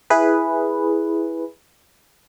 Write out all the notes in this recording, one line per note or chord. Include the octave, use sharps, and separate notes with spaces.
E4 G#4 B4